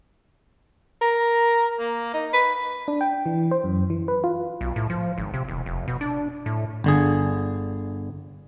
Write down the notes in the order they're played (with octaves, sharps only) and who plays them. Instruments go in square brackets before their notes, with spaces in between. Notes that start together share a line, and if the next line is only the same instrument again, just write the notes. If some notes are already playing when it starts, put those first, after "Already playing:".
[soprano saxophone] A#4
A#3
D#4
B4
[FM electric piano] D4
G5
E3
C5
F#2
E3
B4
F4
[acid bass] B1
A2
F3
G#1
C3
E1
F1
B2
D4
A2
[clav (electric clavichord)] G1 D3 G#4